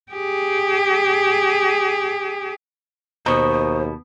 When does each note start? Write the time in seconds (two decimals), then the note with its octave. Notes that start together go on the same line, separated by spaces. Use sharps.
0.12 G4 G#4
3.26 D#2 B2 C5 A#5 C#6 D#6